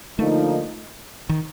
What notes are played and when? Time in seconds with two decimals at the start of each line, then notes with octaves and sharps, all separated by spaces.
0.18 D3 F3 A3 A#3 D#4
1.29 D#3